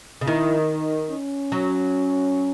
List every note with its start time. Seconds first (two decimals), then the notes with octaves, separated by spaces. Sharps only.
0.21 C#3
0.27 D#3 E4
0.69 D#4
1.10 C#4
1.52 F#3